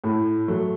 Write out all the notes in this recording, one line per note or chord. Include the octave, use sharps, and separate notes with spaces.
A2
F#3 A3